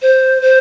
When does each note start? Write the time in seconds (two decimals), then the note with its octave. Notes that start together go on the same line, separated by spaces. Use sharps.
0.02 C5
0.42 C5